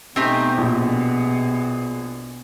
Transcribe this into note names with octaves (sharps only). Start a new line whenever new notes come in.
B2 A3 C4 D#4 G4 C5 G#5
A#1 G#4